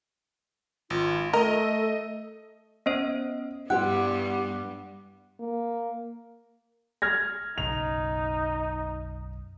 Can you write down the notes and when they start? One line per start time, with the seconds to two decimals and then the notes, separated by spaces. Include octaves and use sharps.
0.90 G#1 F4
1.33 A3 A4 A#4 D#5
2.86 B3 C#4 C5 D#5
3.70 G2 G3 B3 E4 G4 C5 F#5 F#6
5.40 A#3
7.02 F6 G#6 A#6
7.58 F#1 B1 C#3 D#4 F7